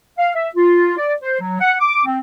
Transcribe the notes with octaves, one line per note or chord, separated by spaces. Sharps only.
F5
E5
F4
D5
C5
F#3
F#5
D6
C4